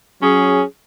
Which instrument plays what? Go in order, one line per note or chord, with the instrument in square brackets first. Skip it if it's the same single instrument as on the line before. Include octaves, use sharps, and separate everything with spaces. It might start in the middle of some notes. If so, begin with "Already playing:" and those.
[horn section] F#3 C#4 G#4